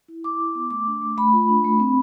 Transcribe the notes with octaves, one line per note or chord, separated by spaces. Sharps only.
E4
E4 D6
E4
B3
A3 D6
D4
A3
A3 B5
F4
D4
A3
C4